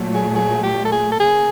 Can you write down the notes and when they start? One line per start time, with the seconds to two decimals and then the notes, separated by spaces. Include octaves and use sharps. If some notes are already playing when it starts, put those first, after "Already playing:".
Already playing: A#2 F#3 A3
0.14 G#4
0.35 G#4
0.63 G4
0.85 A4
0.92 G#4
1.12 A4
1.20 C#3 A#3 G#4